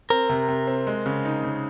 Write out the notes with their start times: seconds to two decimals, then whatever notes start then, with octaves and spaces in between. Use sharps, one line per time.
0.10 C4 A#4
0.29 C3
0.48 C3
0.67 C4
0.87 G#3
1.06 C#3
1.25 D#4
1.43 C#3